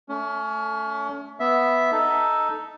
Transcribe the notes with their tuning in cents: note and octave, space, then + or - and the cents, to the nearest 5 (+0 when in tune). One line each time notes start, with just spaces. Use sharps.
A3 +0 C#4 +30
B3 +0 E5 +0
D#4 +0 A4 +0